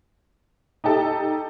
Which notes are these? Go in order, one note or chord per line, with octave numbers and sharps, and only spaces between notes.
D#4 G4 A4